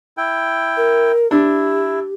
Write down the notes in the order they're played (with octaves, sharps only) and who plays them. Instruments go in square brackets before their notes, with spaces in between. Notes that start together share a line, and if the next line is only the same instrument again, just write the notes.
[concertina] E4 G5
[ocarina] A#4
[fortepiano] D4 [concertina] E4 [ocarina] G4